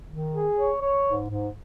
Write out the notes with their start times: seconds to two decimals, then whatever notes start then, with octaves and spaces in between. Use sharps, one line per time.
0.09 D#3
0.34 G#4
0.57 C#5
0.81 C#5
1.06 G#2
1.30 G#2